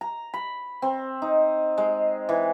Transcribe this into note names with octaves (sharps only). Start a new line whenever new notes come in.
A#5
B5
C4
D#4
G#3
E3